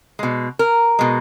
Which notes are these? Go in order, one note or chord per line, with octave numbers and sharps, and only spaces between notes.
B2 G#3
A#4
B2 G#3